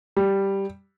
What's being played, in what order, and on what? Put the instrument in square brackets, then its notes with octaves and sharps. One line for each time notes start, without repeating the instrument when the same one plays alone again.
[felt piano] G3